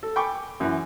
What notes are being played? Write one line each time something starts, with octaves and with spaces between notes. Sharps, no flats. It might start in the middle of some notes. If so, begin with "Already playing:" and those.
A4
G5 G#5 B5 C#6 D6
F#2 E3